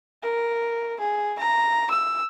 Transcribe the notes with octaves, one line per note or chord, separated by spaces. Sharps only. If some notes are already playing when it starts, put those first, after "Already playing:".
A#4
G#4
A#5
E6